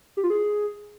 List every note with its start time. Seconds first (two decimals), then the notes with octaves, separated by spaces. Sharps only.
0.17 G4
0.24 F4
0.30 G#4